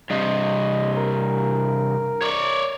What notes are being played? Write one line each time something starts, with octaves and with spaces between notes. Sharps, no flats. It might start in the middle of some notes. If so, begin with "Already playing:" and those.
G2 C3 D#5
A#4
C#5 D5